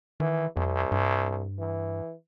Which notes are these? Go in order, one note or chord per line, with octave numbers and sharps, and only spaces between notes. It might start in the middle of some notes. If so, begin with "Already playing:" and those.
D#3 E3
C2 F2
G2
E3